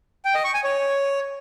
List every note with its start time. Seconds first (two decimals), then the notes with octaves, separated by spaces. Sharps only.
0.25 G5
0.35 D#5
0.44 C#6
0.54 G#5
0.64 C#5